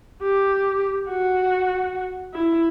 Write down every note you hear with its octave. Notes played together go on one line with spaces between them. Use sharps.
G4
F#4
E4